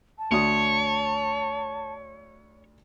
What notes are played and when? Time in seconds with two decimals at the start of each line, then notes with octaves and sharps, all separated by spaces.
0.19 A5
0.32 D2 C#5 D#6